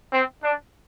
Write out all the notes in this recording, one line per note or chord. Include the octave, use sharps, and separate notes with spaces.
C4
D4